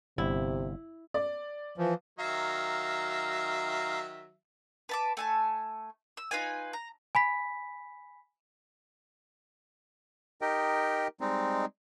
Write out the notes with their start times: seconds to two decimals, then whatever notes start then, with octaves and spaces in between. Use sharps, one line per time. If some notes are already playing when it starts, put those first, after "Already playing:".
0.18 G1 C3 E4
1.14 D5
1.78 E3 F3
2.19 D#3 F#3 E5 F5 A#5
4.89 B4 A5 D6
5.17 A3 G#5 A5
6.17 E6
6.31 D#4 F4 B4 G#5
6.73 A#5
7.15 G#5 B5 B6
10.42 D#4 G4 A#4 D#5 G5
11.21 G3 G#3 C4 D#4